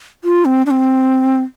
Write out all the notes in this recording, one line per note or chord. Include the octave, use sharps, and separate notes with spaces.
F4
C4
D4
C4